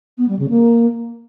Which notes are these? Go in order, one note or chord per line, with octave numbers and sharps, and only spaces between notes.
B3
G3
C#3
A#3